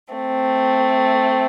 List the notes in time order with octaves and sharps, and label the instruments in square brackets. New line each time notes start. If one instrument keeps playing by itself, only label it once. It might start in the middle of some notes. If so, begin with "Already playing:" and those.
[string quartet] A3 C4